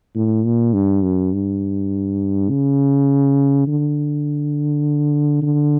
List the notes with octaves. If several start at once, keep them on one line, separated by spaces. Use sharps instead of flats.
A2
A#2
G2
F#2
G2
C#3
D3
D3